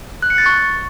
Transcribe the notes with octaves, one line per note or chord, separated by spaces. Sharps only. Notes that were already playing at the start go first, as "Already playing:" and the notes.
F#6
C#7
A6
C#6